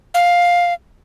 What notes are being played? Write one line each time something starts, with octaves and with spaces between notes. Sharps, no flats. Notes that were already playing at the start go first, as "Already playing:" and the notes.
F5